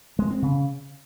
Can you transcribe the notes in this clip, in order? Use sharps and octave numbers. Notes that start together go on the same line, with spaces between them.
G#3
C4
C#3